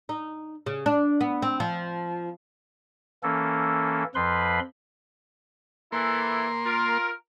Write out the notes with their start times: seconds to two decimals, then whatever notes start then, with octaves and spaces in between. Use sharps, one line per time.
0.09 D#4
0.66 C#3
0.86 D4
1.21 B3
1.42 C4
1.60 F3
3.23 E3 A#3 C#4 A4
4.15 F2 F3 B4 B5 C6
5.92 E3 A#3 E4 A4 C6
6.66 F4 A#4